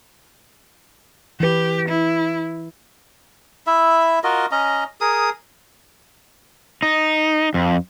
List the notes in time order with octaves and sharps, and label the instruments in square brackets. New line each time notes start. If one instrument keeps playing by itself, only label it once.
[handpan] E3 B4 [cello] G4
[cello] E4
[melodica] E4 E5
F4 F#4 A#4 D#5
C#4 D#5 A#5
G#4 A#4 D#6
[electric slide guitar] D#4
F2